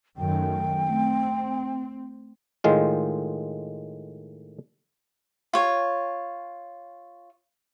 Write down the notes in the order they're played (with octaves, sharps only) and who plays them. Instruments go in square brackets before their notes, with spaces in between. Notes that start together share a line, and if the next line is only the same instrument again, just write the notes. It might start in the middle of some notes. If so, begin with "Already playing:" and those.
[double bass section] F#2 D#3 A3 [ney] G5
[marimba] A3 [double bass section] C4
[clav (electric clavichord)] A2 D#3 G#3 F4
[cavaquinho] F4 C#5